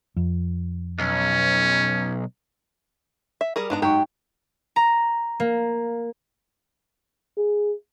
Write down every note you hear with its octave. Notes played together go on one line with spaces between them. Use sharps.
F2
B1 C#4
E5
G3 G#4 A#4
G#2 B3 D4 A#5
G#2 F#3 D#4 G4 G5 C#6
A#5
A#3
G#4